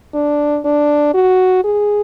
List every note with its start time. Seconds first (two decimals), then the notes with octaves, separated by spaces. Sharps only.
0.14 D4
0.65 D4
1.14 F#4
1.64 G#4